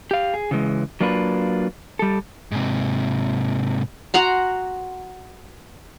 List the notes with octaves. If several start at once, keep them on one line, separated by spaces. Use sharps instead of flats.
G4 F5
G#4
C#3 E3 G#3
F#3 A#3 D4 F4 B4
G3 A4
G#2 C3
F#4 F#5 A#5 C6